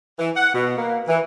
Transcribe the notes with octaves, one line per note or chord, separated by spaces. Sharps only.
E3
F#5
B2
A#3
E3